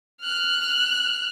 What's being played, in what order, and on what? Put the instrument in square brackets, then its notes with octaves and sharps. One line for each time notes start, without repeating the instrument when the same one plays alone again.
[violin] F6 F#6